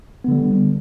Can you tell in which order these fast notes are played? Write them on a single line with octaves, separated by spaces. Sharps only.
B3 D3 G3